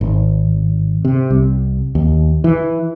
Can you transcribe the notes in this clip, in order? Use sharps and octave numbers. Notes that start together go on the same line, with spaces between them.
G#1
C3
C2
D#2
E3